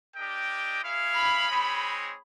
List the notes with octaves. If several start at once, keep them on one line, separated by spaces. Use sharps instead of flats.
D4 G4 A#4 D#5 G5
E4 G#4 C#5 F5
B5
G#3 C4 D#4 G#4 C#5